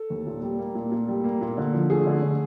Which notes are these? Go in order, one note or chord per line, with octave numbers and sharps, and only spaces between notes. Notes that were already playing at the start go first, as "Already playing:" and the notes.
Already playing: A4
D#2
A#2
G3
A#3
A#2
A#2
G3
A#3
A#2
D3
F3
A3 G#4
D3
D3